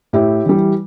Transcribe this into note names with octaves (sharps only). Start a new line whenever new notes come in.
A2 E4 G4
E3 G3